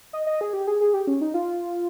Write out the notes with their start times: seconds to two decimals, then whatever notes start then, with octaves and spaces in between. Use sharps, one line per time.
0.13 D#5
0.27 D#5
0.41 G#4
0.53 G4
0.67 G#4
0.81 G#4
0.94 G4
1.07 C#4
1.21 D#4
1.34 F4